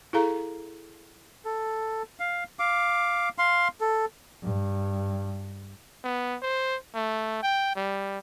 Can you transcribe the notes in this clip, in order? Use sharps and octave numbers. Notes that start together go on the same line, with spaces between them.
E4 G#4 A4 F5 A#5
A4
F5
F5 D6
F5 C6
A4
G2
B3
C5
A3
G5
G3